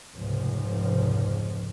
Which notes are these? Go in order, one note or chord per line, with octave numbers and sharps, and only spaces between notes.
F1 C#2 G#2 F3